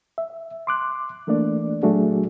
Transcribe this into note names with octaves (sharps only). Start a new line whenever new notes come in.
E5
C6 D6 F#6
E3 A3 A#3 D4 D5
A#2 F#3 A3 D4 F#4 G#4